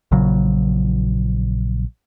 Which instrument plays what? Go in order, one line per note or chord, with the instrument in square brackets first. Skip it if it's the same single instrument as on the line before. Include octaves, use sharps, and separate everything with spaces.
[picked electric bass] A#1 A#2 C#3 F#3